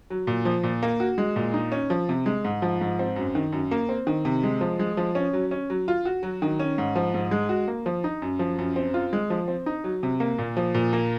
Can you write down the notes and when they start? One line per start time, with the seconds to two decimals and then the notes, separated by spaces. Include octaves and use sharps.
0.10 F#3
0.27 A#2
0.45 F3
0.63 A#2
0.83 A#3
1.00 F#4
1.18 G#3
1.36 A#2
1.54 D#4
1.72 C#4
1.90 F3
2.09 C3
2.26 G#3
2.45 G#2
2.62 F3
2.81 G#2
2.99 C4
3.16 F#2
3.35 D#3
3.52 F#2
3.71 A#3
3.89 C4
4.07 D#3
4.25 C3
4.43 G#3
4.61 F3
4.79 G#3
4.97 F3
5.15 C#4
5.33 F#3
5.51 C#4
5.70 F#3
5.88 F4
6.05 F#4
6.23 F#3
6.42 D#3
6.59 C#4
6.78 G#2
6.96 F3
7.14 G#2
7.31 G#3
7.49 F#4
7.68 A#3
7.86 F3
8.04 D#4
8.22 F#2
8.39 F3
8.58 F#2
8.76 C4
8.94 F4
9.13 G#3
9.30 F3
9.48 C4
9.66 D#4
9.84 F#3
10.03 C3
10.20 A#3
10.38 A#2
10.57 F3
10.74 A#2
10.93 A#3